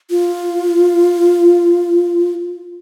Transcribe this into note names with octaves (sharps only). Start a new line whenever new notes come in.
F4